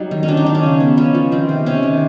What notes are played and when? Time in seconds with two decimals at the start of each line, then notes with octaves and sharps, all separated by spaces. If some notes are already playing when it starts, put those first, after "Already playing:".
Already playing: F#3 G3 D#4
0.11 D#3
0.23 C#4
0.28 F#3 D4
0.37 D#4
0.46 D#3 D4
0.55 C#4
0.63 C#3
0.80 B3
0.97 F3 C#4
1.15 F3
1.32 D#3 C4
1.49 C3
1.66 C3 C#4
1.83 D#3